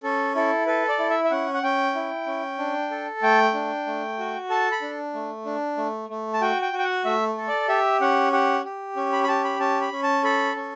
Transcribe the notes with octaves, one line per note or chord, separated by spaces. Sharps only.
C#4 A4
E4 A4
A4 B4
D5
E4
E5
E5
C#4 F#5
F#5
C#4 G5
E4
C#4
D4
A4
A3 G5
D4
A3
F#4
A4 A5
B5
D4
A3
D4
A3
A3
A5
F#4 G5
G5
F#4
G5
F#5
A3 E5
A4
D5
G4 E5
C#4 F#5
G4 F#5
G4
C#4
B5
B5
G4 A5
B5
C#4 A5
B5
C#4
A5
A4 B5
C#4